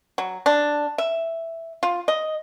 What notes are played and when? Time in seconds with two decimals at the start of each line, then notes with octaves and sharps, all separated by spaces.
0.18 F#3
0.46 D4
0.98 E5
1.83 F4
2.08 D#5